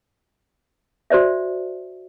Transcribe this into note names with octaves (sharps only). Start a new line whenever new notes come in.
F#4 C5 D5 E5